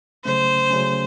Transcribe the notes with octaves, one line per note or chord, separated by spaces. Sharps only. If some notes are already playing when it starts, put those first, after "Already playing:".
C#3 F#3 A3 C#4 C5
C#3 F#3 A3 C#4